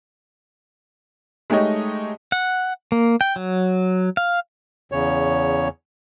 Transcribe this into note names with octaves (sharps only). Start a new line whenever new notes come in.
G#3 A3 D#4 G4 C#5 D#5
F#5
A#3
G5
F#3
F5
E2 C#3 C#5